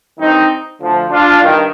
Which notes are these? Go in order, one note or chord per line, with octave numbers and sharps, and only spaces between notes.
G2 D#3 C4 D#4
D2 D3 F3
D4 F4
G2 D#3